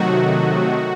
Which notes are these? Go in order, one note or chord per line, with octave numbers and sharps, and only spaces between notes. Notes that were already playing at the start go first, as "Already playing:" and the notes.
Already playing: C3 D#3 F#3 A3 D#4 F#4